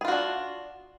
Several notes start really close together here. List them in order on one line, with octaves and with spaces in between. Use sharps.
G#4 F4 F#4 D4